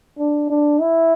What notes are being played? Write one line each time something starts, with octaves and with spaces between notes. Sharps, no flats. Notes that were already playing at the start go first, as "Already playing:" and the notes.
D4
D4
E4